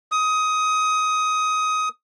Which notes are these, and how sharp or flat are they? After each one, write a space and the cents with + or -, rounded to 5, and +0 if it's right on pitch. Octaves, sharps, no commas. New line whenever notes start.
D#6 +15